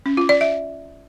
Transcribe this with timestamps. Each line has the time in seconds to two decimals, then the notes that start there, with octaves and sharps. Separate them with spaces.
0.06 C#4
0.17 F4
0.29 D5
0.41 E5